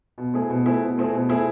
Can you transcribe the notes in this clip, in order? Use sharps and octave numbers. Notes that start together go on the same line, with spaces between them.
B2
A3 C4 E4 G#4
B2
A3 C4 E4 G#4
B2
A3 C4 E4 G#4
B2
A3 C4 E4 G#4